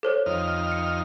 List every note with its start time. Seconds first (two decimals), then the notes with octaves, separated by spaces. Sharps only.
0.03 A4 C5 C#5
0.26 F2 D#4 F6
0.72 C#7